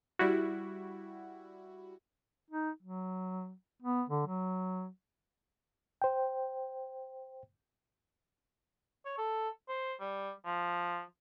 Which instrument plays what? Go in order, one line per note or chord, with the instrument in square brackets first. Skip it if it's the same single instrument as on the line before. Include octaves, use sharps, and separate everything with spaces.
[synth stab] G3 E4 F#4
[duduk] D#4
F#3
B3
D3
F#3
[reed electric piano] C5 G5
[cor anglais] C#5
A4
C5
G3
F3